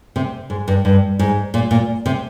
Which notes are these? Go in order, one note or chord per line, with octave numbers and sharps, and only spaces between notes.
C3
G#2
G2
G2
G#2
A#2
A#2
C3